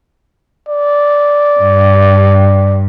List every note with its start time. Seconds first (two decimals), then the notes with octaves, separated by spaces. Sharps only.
0.69 D5
1.60 G2